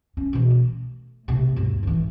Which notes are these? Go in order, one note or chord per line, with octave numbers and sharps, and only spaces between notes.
C#4
B2 E3
A3
C3 A3
G1 D2
G#2 E3